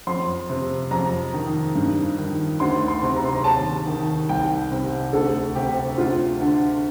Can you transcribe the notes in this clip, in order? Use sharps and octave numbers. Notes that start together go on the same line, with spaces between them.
F2 C6
C3
F2 A#5
D#3
G2
D#3
D2 C6
C6
C3
A#5
C6
A#5
D#2 A5
D#3
C2 G5
C3
D2 A4
C3 G4
D2 F4
D3